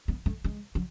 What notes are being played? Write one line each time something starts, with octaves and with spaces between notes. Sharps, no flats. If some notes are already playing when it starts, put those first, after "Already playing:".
B3
A3
G#3
F#3